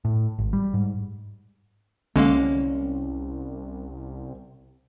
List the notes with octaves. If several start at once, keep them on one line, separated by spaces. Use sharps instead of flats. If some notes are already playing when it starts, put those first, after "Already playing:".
A2
G#1
G3
G#2
C2 D3 G#3 A#3 C#4